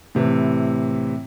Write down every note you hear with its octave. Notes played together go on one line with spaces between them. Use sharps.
A2 C3 E3